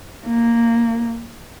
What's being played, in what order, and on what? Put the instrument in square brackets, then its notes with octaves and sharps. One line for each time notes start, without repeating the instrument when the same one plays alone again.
[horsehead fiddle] A#3